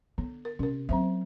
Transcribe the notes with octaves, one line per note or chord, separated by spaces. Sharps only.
D3 B3
A#4
C3 C#4 A#4
F#3 A#3 C4 C5 E5